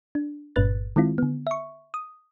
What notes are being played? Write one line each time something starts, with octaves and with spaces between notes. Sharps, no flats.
D4
G1 G2 A#2 B4 F#6 A6
D#3 G#3 C4 E4 F4
D3 B3
E5 C#6
D#6